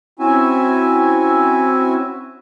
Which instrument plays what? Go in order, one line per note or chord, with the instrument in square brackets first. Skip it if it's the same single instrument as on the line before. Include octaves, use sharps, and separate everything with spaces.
[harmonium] C4 C#4 E4 F#4 E5 G#5